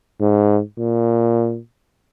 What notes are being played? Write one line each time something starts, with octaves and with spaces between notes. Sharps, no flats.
G#2
A#2